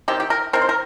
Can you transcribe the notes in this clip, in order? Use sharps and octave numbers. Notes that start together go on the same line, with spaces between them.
D#3 C4 G4
G4
A#4
D#3 C4 A#4
C5
A#4